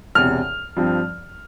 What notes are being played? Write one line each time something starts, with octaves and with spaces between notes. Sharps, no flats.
E1 E2 C3 F6
G2 F3 C4